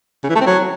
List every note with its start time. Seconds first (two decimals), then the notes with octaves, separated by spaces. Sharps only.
0.24 C#3
0.29 E3
0.35 A3
0.41 C4
0.46 F#3